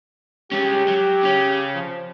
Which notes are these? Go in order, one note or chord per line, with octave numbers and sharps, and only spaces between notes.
G#3 C#4 G4
F#3
C#3 C#4
F3